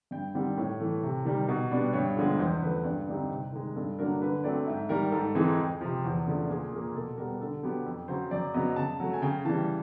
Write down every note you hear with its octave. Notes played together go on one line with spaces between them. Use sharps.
G2 G5
D#3 G3 C4 F#5
A2 C#5
E3 A3
C3
D#3 G3
B2
G3 B3 D4
G2 C#5
D3 F3 G#3 B3
E2 C5
C#3 F3 A3 B4
G2
D3 G3 C4 D#4
C3
D#3 G#3
G2 A4
D3 F#3 A#3 D4 A#4
D3 B4
F#3 A3 C4 D5
G#2 E5
D#3 G3 A#4
G#2 A4
E3 G#3 C4 D#4 G#4
F2
C3 F3
E2
C#3 F3 A3 D4
A#2 G#4
F3 A#3 G#4
B2 A4
G3 B3 A#4
D3 A4
F#3 B3 G4
F2
C#3 F#3 C5
F#2 D5
C#3 F#3 B3 D#5
C#3 A5
F#3 A3
G#5
C#3 G5
E3 G3 A5